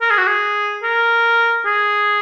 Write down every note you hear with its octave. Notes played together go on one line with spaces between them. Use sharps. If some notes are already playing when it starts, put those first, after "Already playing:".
A#4
G#4
F#4
G#4
A#4
G#4